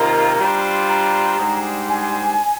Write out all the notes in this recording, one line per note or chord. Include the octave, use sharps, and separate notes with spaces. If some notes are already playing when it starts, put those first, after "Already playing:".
Already playing: C3 D#3 A#3 F4 C5 A#5
G3 D4 F4 C5
A#5
G#2 G3 D4 G#4 C5
G#5